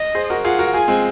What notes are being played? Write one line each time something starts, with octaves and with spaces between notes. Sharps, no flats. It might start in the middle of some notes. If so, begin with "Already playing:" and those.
Already playing: D#5
G#4 C5
F#4 A#4
F4 G#4 F#5
F#4 A#4
F4 G#4 G#5
G#3 C4